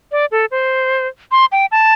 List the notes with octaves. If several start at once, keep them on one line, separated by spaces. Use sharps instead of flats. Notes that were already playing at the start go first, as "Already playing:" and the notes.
D5
A4
C5
C6
G5
A5